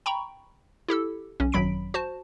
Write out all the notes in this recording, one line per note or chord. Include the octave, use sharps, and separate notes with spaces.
G5 A#5 B5 C#6
E4 G4 A4 E6
B1 C#4
G#1 F#2 F#3 B5 B6 D7
F#4 C5 A5